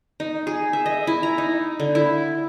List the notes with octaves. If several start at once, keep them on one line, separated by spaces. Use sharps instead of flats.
D#4
G#4
E5
D#5
E4
A#5
D#4
D3
E4